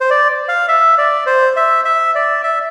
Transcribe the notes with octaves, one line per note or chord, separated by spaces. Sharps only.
C5
D5
F5
E5
D5
C5
E5
E5
D5
E5